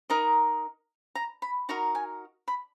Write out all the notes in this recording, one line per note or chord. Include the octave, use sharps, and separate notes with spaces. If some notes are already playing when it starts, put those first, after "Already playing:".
D#4 A#4 D#5 A#5
A#5
B5
D#4 F#4 A#4 A#5
G#5
B5